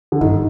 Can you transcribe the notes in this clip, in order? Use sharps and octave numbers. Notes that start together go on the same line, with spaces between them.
D3
G2 D#3